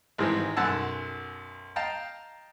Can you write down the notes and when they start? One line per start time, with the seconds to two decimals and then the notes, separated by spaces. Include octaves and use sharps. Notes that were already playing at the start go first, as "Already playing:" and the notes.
0.18 G#1 G#2 E3 G#3 C4
0.56 B1 F#2 F#5 G#5 A5 E6
1.76 D#5 F5 G5 A5 A#5